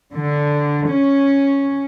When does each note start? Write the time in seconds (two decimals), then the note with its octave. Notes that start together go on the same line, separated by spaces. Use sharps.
0.14 D3
0.89 C#4